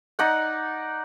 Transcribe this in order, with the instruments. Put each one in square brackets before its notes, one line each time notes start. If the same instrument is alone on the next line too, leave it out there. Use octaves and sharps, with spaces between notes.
[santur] D#4 D5 F#5